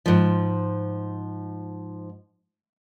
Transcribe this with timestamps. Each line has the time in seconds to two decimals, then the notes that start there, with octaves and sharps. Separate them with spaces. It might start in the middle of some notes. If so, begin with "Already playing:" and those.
0.06 G#2 F3